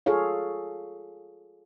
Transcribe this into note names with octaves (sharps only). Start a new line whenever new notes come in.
F4 G#4 A4 C#5 F5